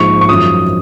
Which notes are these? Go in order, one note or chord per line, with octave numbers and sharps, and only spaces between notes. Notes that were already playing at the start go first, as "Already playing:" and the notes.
Already playing: A#1 G#2 F3 C#6
C#6
G#1 F#2 F3 D#6